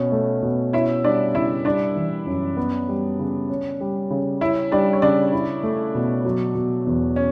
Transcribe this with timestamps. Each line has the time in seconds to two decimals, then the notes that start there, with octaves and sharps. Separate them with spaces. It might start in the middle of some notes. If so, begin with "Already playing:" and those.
Already playing: B2 C#4
0.12 A3
0.43 B2
0.73 C#4 E4 E5
1.04 G3 D4 D5
1.35 C#3 E4 E5
1.65 G3 D4 D5
1.96 E3
2.27 F#2
2.57 B3
2.89 G3
3.19 C#3
3.50 C#4
3.81 G3
4.10 C#3
4.41 C#4 E4 E5
4.72 G3 D4 D5
4.93 C#5
5.02 C#3 D4 D5
5.33 E4
5.63 A3
5.95 B2
6.25 F#3
6.55 B2
6.86 E2
7.16 C#4